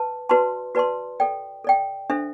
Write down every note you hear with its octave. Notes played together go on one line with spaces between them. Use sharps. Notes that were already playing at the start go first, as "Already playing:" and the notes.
Already playing: B4 A5
F#4 B4 D5 A5 C6
F#4 B4 D5 A5 C6
A4 D5 G5
A4 D5 G5
D4 A4 C5 E5